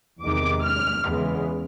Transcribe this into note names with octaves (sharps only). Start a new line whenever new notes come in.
E2 C3 D#3 G#3 D6
F6
E2 C#3 E3 G#3 B3